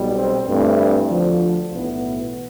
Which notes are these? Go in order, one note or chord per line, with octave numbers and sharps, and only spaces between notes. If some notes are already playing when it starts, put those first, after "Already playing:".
Already playing: B1 B2 G3
C4
G2 E3 A3 C4
D4
D2 D3 F3
B1 A2 E3 B3